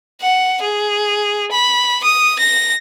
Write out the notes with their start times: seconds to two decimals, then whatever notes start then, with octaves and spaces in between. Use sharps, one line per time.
0.21 F#5
0.62 G#4
1.52 B5
2.04 D#6
2.39 A#6